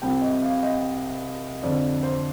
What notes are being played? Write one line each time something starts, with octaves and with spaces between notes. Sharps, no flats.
C2 C3 F3 G5
D#5
F5
D#5
F2 D3 F3 D5
C5